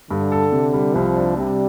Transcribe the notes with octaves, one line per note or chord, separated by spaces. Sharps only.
G2 D3
A4
C3
G3
C2 F3
D4
C3 G3